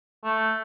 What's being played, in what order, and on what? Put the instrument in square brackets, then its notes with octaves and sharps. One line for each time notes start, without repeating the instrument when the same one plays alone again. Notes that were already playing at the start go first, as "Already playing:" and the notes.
[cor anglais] A3